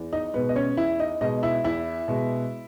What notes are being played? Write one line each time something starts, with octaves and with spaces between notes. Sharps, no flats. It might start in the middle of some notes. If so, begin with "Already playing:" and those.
Already playing: E2
D#4 D#5
B2 G#3 B3 B4
D#5
C#4 C#5
E2 E4 E5
D#4 D#5
B2 G#3 D#4 D#5
E4 E5
E2 E4 E5
B2 G#3